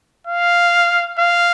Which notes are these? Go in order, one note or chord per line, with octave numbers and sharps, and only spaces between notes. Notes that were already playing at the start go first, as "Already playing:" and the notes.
F5
F5